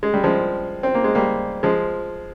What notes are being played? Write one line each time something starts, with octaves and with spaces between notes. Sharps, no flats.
G#3
G3
F3 G#3
C4
A#3
G#3
G3 A#3
F3 G#3